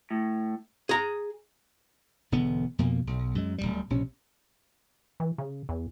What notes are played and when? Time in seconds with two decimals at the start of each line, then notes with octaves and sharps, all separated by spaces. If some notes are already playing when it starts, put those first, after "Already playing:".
0.11 A2
0.89 G#4 A#5
2.32 E1 D3 B3
2.79 F2 B2 A#3
3.07 B1
3.35 F#2 G#3
3.58 D1 A#1 G3
3.90 A#1 C3 C#4
5.20 E3
5.38 C#3
5.69 E2